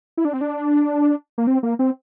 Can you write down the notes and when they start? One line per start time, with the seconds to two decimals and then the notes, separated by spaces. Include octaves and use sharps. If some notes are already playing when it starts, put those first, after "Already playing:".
0.17 E4
0.25 D4
0.33 C4
0.41 D4
1.38 A#3
1.47 C4
1.63 A#3
1.79 C4